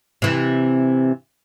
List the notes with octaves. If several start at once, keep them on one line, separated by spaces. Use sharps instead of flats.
C3 E3